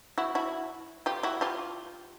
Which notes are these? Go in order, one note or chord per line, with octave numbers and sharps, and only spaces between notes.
E4 F#4
E4 F#4
F4 G4
E4 F#4
F4 G4